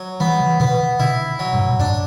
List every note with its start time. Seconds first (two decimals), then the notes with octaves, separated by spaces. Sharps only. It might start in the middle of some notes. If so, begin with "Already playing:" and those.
Already playing: F#3
0.20 E3 G3 B3
0.40 C#3 E3
0.60 B2 D3 B3
0.99 B2 D3 E4
1.39 F#3
1.53 G2 B2
1.69 B2
1.79 F#2 A2 D4